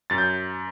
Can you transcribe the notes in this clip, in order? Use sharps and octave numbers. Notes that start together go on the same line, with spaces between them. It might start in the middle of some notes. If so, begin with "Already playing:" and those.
F#2 A6
G6